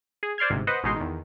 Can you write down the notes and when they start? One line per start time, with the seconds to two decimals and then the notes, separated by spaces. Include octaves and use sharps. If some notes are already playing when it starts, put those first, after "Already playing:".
0.23 G#4
0.38 C5 D5 C6 F6 G#6
0.50 G1 G#2 C3
0.67 B4 C5 D#5 F#5
0.83 A1 B2 G#3 D#4 C6
0.96 E2 D#3